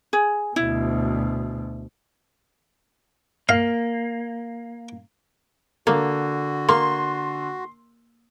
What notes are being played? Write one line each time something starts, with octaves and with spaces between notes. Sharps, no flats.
G#4
D2 B2 E4
A#3 F5
D3 A#3 F#4
A#3 C6